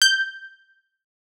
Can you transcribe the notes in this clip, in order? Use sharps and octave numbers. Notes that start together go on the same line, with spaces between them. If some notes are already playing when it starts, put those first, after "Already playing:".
G6